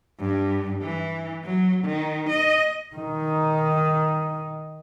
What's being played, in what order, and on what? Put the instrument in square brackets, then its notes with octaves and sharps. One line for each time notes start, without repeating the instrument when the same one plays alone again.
[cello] G2
E3
F#3
D#3
D#5
[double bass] D#3 D#4